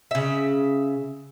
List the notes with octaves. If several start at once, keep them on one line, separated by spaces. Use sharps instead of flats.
C#3 E5